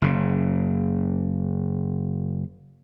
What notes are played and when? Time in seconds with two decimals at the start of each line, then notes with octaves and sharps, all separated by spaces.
0.02 F#1 C#3